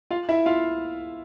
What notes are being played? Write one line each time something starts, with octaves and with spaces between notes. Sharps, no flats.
F4 F5
E4 E5
F4 F5